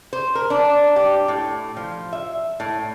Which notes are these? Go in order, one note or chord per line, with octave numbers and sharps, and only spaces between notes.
C5
A#4
D4
G4
A2
F3
E5
A2